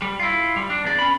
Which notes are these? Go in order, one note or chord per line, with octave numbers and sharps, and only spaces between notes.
G3
E4 F4
G3
D4
E2 D5
C#4 B5